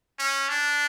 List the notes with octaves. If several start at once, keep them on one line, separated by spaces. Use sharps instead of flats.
C#4
D4